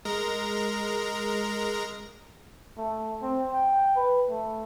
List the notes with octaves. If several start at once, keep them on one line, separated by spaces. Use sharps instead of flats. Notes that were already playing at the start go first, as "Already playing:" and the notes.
G#3 A#4 A#6
A3
C4
G5
B4
A3